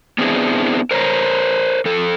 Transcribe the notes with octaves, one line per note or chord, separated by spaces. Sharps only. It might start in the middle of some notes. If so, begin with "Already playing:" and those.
B3 C4 D4 E4 G#4
A#4 C5 C#5 A#5
F2 A4